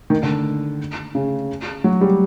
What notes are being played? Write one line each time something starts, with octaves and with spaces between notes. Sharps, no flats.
D#3
D3
C#3
F#3
G3